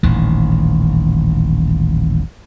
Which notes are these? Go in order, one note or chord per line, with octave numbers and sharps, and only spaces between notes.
D#1 A1 D#3